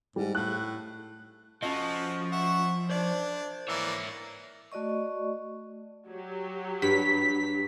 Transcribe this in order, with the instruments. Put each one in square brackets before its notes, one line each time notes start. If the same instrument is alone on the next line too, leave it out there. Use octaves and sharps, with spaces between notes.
[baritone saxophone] G#2 [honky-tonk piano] G3
[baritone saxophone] A2 [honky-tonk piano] F#6
[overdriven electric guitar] F3 [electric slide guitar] C#4 D#5 [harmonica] F#4 A4
[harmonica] E5 F#5 C#6
[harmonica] D4 [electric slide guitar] C5 D5
[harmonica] E3 A#3 D5 [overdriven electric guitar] C#5 E5
[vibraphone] A3 F#4 D5 D#5 C#6
[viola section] F#3 G4
[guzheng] G2 [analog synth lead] B6